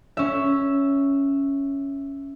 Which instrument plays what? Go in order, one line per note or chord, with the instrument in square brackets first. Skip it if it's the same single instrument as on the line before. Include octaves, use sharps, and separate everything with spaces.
[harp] C#4 E5